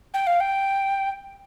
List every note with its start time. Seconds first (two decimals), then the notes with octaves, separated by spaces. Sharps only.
0.14 G5
0.27 F5
0.40 G5